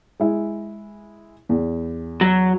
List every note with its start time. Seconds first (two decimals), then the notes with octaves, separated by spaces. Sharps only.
0.20 G#3 E4
1.49 E2
2.21 F#3